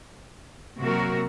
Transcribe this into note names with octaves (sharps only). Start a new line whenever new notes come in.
C3 F#3 A#3 F#4 A#4